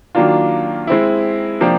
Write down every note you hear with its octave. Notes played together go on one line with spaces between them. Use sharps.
D#3 F#3 A#3 D4 F4
G#3 C4 E4
C3 F3 A#3 D4 G4